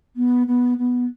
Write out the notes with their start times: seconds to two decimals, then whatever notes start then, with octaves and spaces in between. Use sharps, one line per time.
0.16 B3
0.47 B3
0.78 B3